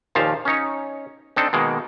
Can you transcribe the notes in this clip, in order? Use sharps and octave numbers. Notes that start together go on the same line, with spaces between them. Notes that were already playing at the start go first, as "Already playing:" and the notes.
D#2 A#2 F3 F5 A5
C#4 D#4 C#5
C4 D4 D#4 A4
B2 D#3 G#3 A#3